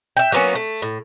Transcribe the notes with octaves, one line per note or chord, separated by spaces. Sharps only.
E5 G5
F#3 A#3 B3 C#4
A3
A2